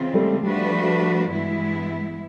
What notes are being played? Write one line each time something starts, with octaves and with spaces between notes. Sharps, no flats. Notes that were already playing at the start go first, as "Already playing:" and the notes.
Already playing: C#3 E3 G#3 C4 F4
G3 A3
F3 G3 A3 D4 F#4 B4
G2 E3 G#3 B3 E4